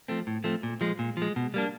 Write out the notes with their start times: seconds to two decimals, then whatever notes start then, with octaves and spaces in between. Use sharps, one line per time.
0.08 F3 A3 C4
0.27 A2
0.44 F3 A3 C4
0.63 A#2
0.81 F3 G#3
0.99 A#2
1.17 F3 G#3
1.36 B2
1.54 G3 A#3 D4